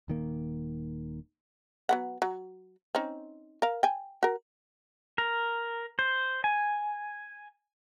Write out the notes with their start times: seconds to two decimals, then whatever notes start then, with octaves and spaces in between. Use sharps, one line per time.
0.08 D#1 D#3 A#3
1.89 F#3 B3 F#5
2.22 F#3
2.95 C4 C#4 D#4
3.62 A#4 F5
3.83 G5 G#5
4.23 F#4 A#4
5.18 A#4
5.99 C5
6.44 G#5